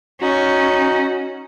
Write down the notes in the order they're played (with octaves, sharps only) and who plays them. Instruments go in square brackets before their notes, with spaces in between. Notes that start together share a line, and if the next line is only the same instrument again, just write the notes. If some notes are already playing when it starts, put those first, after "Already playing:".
[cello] C#4 [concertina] D#4 [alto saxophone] F#4